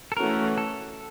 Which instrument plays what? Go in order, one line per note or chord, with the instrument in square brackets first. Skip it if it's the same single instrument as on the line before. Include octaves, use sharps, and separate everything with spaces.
[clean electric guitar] A4
[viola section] E3 A3 C#4 F#4 [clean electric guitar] A#4
[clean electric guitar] A4